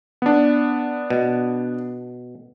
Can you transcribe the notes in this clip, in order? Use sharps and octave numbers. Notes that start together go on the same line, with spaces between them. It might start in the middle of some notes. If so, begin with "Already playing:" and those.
B3 D4
B2